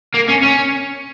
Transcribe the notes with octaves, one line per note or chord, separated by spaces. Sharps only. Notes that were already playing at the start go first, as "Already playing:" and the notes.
A#3
C#4
C#4